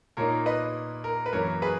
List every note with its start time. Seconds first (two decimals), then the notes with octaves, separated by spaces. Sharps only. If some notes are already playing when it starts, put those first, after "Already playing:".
0.17 A#2 A#3 D#4 A#4 C#5
0.46 B4 D#5
1.04 A#4
1.26 B4
1.32 F#2 E3 A#3 A#4 C#5
1.62 G#4 B4